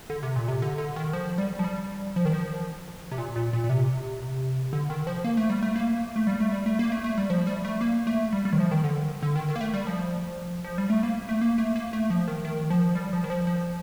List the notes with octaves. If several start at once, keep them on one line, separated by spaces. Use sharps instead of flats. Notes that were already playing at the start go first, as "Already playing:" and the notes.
D3
C3
A#2
C3
D3
D3
D#3
F3
G3
F3
G3
F3
D#3
F3
C3
A#2
A#2
A#2
A#2
C3
D3
D#3
F3
A#3
A3
G3
A3
A#3
A3
G3
A3
G3
A3
A#3
A3
A3
G3
F3
G3
A3
A#3
A3
G3
G3
D#3
F3
D#3
D3
D3
D#3
D#3
A#3
A3
G3
F3
F3
G3
A3
A#3
A3
A#3
A3
A#3
A3
F3
D#3
D#3
F3
G3
F3
D#3
F3
F3